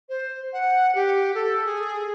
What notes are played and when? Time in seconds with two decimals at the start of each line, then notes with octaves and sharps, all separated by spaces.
0.09 C5
0.52 F#5
0.95 G4
1.35 A4
1.65 G#4